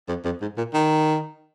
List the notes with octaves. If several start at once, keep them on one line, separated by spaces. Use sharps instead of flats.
F2
F2
G#2
A#2
D#3